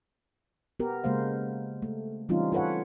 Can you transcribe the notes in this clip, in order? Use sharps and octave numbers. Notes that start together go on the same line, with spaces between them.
B3 G4 A#4
C#3 G#3 A#3 C5 F5
A3
E3 G3 C4 C#4 D#4 F4
F4 A4 B4 C#5 F#5